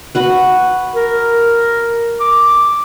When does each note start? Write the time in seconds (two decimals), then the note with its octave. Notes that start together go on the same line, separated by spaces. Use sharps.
0.15 F#4 B4
0.95 A#4
2.21 D6